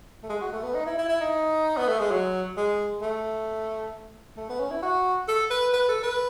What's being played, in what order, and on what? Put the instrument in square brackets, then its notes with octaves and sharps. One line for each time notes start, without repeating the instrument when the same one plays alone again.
[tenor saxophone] A3
G#3
F#4
A3
B3
D#4
E4
E4
E4
D#4
B3
A3
G#3
F#3
G#3
A3
A3
B3
C#4
E4
F#4
A4
B4
B4
A4
B4